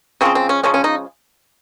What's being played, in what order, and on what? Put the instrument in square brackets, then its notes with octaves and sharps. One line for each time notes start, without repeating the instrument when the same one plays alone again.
[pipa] C#3 F3 G#3 C4
C4
C#4
C#3 F3 G#3 C#4
C#4
D#4